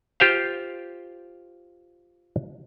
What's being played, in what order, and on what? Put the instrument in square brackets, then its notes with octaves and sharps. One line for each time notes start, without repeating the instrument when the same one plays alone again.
[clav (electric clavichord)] F4 G4 C5 F5